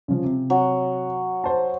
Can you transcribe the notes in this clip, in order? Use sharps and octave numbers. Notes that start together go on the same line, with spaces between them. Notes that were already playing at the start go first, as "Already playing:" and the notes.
C#3 F3
C3
F#3
C5 A5